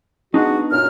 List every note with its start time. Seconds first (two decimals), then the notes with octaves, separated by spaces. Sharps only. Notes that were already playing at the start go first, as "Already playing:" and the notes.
0.34 G#3 B3 D4 D#4 F#4
0.72 F#2 A#2 F6